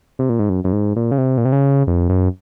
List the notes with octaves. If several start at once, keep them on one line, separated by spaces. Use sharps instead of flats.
C3
A#2
G#2
F#2
F#2
G#2
A#2
C#3
C3
A#2
C3
C#3
F2
F#2